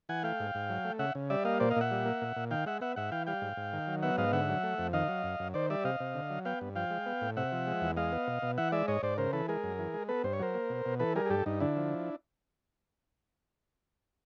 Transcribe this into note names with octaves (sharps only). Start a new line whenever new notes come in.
E3 F#5 G#5
A3 F5 G5
G#2
G#2
F#3
A3
C#3 E5 F#5
C#3
G3 D5 E5
A#3 D#5 F5
A#2 C5 D5
D#5 F5
A#2 E5 F#5
G3
A#3
A#2
A#2
D#3 F5 G5
G#3 E5 F#5
B3 E5 F#5
G#2 E5 F#5
E3 F5 G5
G3 F5 G5
G#2
G#2
D#3
F#3
B3 E5 F#5
G#2 D#5 F5
D3 E5 F#5
F#3
A3
F2
D#3 D#5 F5
F#3
F#2
F#2
D#3 C5 D5
G3 D5 E5
C3 D#5 F5
C3
D3
F#3
B3 F5 G5
G2
F3 F5 G5
G#3
B3
A2
C3 E5 F#5
F3
G#3
E2
G#3 D#5 F5
B3
B2
B2
E3 E5 F#5
G#3 D5 E5
G#2 C#5 D#5
G#2 C5 D5
C#3 A#4 C5
E3 A4 B4
G#3 G#4 A#4
F#2
E3
G#3
B3 A4 B4
G2 C5
C#5
F#3 A#4 C5
A#3
B2
B2
E3 A4 B4
G3 G#4 A#4
G#4
G2 G4 A4
G2 D#4
D3 D4 E4
F3